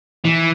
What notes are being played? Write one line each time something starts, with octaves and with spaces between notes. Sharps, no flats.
E3